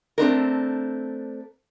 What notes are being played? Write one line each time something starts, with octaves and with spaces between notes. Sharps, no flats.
A3 C4 D4 A#4